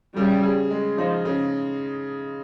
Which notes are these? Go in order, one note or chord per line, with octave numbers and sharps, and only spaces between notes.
C#3 G3
G#4
G#3
F3 D#4
C#3